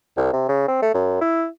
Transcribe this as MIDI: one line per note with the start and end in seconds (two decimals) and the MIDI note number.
0.17 0.29 36
0.33 0.46 48
0.49 0.67 49
0.68 0.82 60
0.82 0.89 57
0.94 1.19 42
1.21 1.47 64